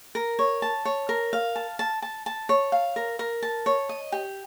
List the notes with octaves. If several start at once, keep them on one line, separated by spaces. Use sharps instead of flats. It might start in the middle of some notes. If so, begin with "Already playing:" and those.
A#4
C#5
A5
C#5
A#4
F5
A5
A5
A5
A5
C#5
F5
A#4
A#4
A5
C#5
D#5
G4